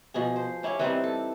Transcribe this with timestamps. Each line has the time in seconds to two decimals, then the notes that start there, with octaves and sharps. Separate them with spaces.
0.14 B2 F3 G#4
0.36 C5
0.63 C#4 E4 G4 C#5
0.79 E3 G3 C4 D#4
1.04 A4